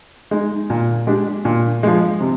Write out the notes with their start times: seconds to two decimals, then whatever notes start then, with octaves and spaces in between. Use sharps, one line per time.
0.31 G#3 D#4
0.70 A#2
1.07 G#3 D4 G4
1.45 A#2
1.83 F3 G#3
2.21 C3